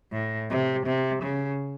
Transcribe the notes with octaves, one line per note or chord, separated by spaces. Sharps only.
A2
C3
C3
C#3